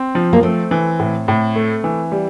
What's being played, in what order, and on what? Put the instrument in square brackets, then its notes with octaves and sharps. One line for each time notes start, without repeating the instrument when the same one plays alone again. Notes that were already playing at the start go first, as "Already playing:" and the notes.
Already playing: [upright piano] C4
F3
[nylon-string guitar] A#3
[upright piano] A3 [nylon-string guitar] C4
[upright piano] E3
A2
A2
A3
E3
G3